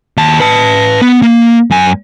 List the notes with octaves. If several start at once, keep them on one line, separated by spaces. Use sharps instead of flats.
D#2 A5
B4 A5
B3
A#3
F#2 G#5